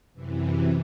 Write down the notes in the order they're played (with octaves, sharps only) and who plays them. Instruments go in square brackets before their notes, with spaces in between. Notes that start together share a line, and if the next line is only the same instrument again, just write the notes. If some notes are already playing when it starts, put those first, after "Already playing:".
[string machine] F#2 C3 E3